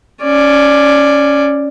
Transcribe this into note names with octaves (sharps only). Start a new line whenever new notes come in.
C#4 D5